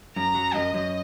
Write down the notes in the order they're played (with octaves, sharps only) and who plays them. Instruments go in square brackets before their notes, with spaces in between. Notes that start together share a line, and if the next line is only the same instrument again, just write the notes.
[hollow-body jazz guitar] F#2 [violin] A#5
[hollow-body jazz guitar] F#3
[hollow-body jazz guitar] F#2 [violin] D#5
[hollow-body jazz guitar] F#2